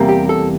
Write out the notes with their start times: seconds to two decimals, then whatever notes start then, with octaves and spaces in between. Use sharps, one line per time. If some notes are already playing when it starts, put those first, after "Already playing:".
Already playing: E2 C3 G3 A#3
0.09 G4
0.29 A4